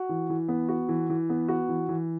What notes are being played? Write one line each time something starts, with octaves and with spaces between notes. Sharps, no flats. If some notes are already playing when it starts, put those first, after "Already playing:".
Already playing: F#4
E3
E3
B3
F#4
E3
E3
B3
F#4
E3
E3